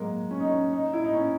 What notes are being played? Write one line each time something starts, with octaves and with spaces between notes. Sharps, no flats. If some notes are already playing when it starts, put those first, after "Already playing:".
Already playing: F#3 G#3 A#3
C#4
D#4
C#4
D#4
E4
D#4
C#4